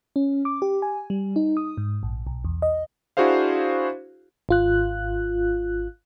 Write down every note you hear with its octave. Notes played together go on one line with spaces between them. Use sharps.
C#4
D6
G4
G#5
G3
D#4
D#6
G#2
A#1
B1
E2
D#5
D4 E4 F#4 G#4 C5 F5
G#1 F4 F#6